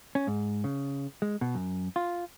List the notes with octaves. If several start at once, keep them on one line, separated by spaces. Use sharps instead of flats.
C#4
G#2
C#3
G#3
B2
F#2
F4